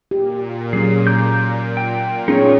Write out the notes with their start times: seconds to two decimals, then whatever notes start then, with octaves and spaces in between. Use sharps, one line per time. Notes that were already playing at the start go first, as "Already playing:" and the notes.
0.11 A#2 G4
0.73 F#3 C#4 G#4
1.07 A#5 D6 G6
1.77 G5
2.28 B3 C#4 D#4 F4 G#4 C#5